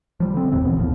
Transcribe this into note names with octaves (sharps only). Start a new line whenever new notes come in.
F3 G3
D3 C4
F#1 D#2 A2 C4
C#2 A#2 E3 B3
D#1 C2 A2 F3